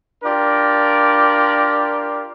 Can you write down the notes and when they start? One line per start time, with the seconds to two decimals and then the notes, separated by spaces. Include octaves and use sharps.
0.23 D4 F4 G4 A#4 D5